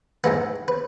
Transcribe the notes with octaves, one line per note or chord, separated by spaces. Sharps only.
G#2 E3 G#3 B3 B4
B4